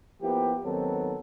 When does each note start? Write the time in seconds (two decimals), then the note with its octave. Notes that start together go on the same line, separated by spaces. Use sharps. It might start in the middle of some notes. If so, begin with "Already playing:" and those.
0.20 F3 A#3 B3 E4 G4
0.63 D#2 D#3 F#3 B3 C4 A4